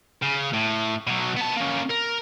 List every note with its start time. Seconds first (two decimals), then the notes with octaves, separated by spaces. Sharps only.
0.22 C#3
0.53 A2
1.07 B2 F#3
1.37 B3 A5
1.57 A#3 C#4
1.91 A#4